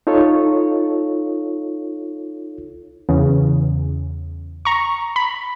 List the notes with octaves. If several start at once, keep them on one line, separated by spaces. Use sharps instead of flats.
D#4 F4 A4 C#5
E2 C#3
A#5 C#6
B5